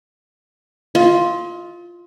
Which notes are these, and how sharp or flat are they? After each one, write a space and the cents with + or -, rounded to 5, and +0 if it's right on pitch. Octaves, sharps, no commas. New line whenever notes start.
F4 +0 D#5 +40